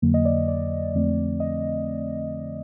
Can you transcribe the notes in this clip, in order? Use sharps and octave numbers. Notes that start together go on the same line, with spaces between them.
F2 D3 F#3 A#3
D#5
D5
D5
D5
F2 D3 F3 A3 C4
D#5